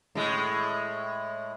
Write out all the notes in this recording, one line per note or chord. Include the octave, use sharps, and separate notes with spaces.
A2 G#3